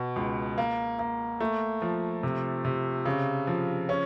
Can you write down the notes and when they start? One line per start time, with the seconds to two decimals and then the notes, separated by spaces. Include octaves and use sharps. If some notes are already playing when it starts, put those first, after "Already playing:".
Already playing: B2
0.16 C#2
0.58 A#3
0.99 A#3
1.40 A3
1.82 F3
2.23 C3
2.65 C3
3.05 C#3
3.47 F3
3.89 C#4